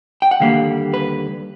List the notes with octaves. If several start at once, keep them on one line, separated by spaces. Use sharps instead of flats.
G5
F#5
D#2 D3 G3 A#3 F5
B4